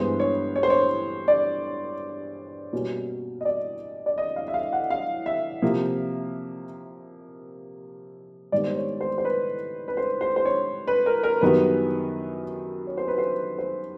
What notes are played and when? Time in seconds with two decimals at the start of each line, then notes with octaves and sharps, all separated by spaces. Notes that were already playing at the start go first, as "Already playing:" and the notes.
Already playing: G2 E3 G#3 B3 C5
0.20 C#5
0.56 C#5
0.63 C5
0.70 C#5
1.28 D5
2.73 B2 G3 A#3 C#4
3.41 D#5
3.45 D5
4.06 D5
4.18 D#5
4.36 F5
4.48 E5
4.54 F5
4.73 F#5
4.90 F5
5.26 E5
5.62 C3 F3 A#3
8.52 G#2 D#3 G3 B3 D5
8.64 C5
8.76 C#5
9.01 C5
9.18 C5
9.25 B4
9.88 B4
9.97 C5
10.21 C5
10.36 C5
10.45 C#5
10.87 B4
11.06 A#4
11.23 A#4
11.41 F#2 D#3 G3 B3 B4
12.87 C#5
12.97 C5
13.08 B4
13.18 C5
13.58 C5